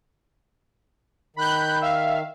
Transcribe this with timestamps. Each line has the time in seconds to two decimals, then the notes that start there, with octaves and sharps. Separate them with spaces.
1.36 D#3 B5 F#6 G6
1.81 E5 F5